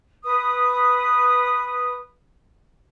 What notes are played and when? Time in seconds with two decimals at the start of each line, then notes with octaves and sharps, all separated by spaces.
0.24 B4 D#6